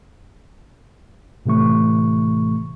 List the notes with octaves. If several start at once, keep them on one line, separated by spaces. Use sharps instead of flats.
A2 C3 E3 A3 C#6